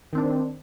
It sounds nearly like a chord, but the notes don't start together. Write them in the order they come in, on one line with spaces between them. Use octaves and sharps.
D#3 C4 D4